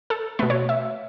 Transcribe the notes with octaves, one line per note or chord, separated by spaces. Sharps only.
A4
B2 A3 B4
C#5
E5